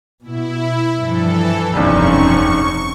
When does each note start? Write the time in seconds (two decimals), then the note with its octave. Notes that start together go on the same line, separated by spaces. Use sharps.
0.23 B2 E4
0.99 G2 E3 F3 A4
1.74 F1 B1 E2 G2 C4 C#4 D#4 C#6